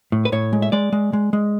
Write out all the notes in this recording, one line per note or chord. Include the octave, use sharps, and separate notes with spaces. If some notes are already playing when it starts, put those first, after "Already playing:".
A2
B4
A2 C#5
G#3
E5
G#3 D5
G#3
G#3
G#3